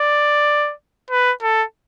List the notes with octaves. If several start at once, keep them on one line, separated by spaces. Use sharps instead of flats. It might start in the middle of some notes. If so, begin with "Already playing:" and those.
Already playing: D5
B4
A4